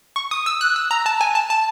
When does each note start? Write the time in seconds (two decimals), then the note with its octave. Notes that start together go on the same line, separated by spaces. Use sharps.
0.16 C#6
0.31 D#6
0.46 E6
0.61 F#6
0.76 E6
0.91 A#5
1.06 A5
1.21 G#5
1.35 A5
1.50 A5